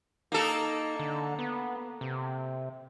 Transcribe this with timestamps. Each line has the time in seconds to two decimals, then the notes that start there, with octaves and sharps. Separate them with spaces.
0.32 A#3 D#4 A4
1.00 D3
1.39 B3
2.01 C3